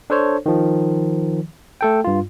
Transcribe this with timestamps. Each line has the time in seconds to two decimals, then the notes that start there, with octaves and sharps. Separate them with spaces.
0.10 D4 A4 C5 C#5
0.46 D#3 F3
1.81 A3 A4 G5
2.04 G2 F4